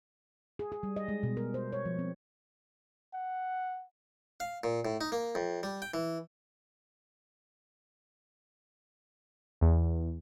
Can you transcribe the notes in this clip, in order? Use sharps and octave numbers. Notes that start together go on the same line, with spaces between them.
G#4
G#4
G3
D#5
G#3
B2
A#4
C5
C#5
F3
C4
F#5
F5
A#2
A2
D#4
A#3
F2
G3
G5
E3
E2